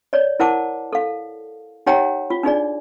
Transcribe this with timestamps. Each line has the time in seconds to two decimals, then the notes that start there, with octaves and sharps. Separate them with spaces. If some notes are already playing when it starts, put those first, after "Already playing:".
0.13 C#5 D5
0.40 E4 A#4 C5 F#5 A5 D6
0.93 A4 F5
1.87 D#4 G4 C#5 F#5 G5 A#5
2.30 F4
2.43 D4 D#4 G#4 D5